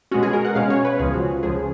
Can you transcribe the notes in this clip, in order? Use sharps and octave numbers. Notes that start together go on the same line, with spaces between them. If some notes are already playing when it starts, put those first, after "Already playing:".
B2 G#3 C#4 F#4
G#4
A#4
F#5
B2 G#3 C#4 F5
C#5
B4
C#2 C#3 F3 G#4
F#4
C#2 C#3 F3 G#4